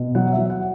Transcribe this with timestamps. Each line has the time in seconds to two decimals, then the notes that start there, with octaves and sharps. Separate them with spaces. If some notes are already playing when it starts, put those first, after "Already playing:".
Already playing: B2
0.15 F#3 F#5
0.32 E5
0.38 F#3
0.50 F#5